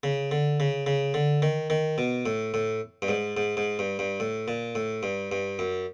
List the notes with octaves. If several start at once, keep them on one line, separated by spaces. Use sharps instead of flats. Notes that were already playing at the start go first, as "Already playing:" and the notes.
C#3
D3
C#3
C#3
D3
D#3
D#3
B2
A2
A2
G2
G#2
G#2
G#2
G2
G2
A2
A#2
A2
G2
G2
F#2